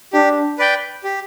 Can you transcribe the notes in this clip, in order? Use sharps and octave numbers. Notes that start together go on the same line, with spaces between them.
D4 G4
B4 D5 G5
G4